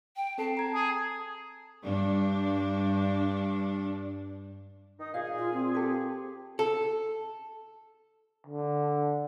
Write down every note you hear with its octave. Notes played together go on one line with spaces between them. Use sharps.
G5
C4 A4 A5 C7
A#5 G#6
G#4 G#5
G2 D4
D#3 D#4 D#6
A#2 G#4 F5
F4
C4
G4 A4
A4
D3